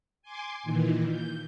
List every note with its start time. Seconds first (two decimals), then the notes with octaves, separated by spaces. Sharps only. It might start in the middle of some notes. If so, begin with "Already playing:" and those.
0.22 G#5 C6 D6
0.63 A#2 D#3 E3
1.07 G6